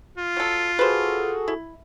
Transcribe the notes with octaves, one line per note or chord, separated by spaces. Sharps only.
F4
F#3 A4
F#4 G#4 A4 B4 C5
E4